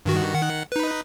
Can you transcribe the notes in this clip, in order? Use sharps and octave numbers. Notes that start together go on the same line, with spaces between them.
G2 D#3 F#4
D#3 F#5
D#4 B4